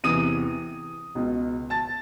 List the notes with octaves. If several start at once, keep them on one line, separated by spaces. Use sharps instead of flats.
E2 C3 E3 D#6 D#7
C#2 B2
A5 A6